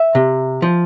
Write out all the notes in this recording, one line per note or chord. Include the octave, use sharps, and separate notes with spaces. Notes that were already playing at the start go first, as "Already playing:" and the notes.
Already playing: E5
C3
F3